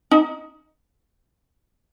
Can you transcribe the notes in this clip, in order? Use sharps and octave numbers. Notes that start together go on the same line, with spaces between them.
D#4